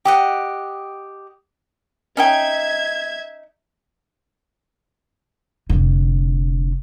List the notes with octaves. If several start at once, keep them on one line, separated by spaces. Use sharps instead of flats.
G4 D#5 F#5 G5
C#4 D#4 E5 G5 G#6
F1 D3